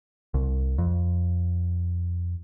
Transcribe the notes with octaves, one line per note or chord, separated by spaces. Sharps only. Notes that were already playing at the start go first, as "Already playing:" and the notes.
C2
F2